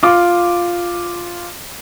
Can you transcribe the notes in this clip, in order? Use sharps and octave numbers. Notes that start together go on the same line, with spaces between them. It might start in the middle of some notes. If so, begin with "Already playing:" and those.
F4 D6